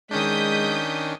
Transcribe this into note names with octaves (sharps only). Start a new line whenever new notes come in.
D#3 G#3 C#4 D4 D#6 G6 B6